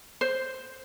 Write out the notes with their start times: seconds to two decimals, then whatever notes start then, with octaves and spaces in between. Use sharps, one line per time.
0.21 C5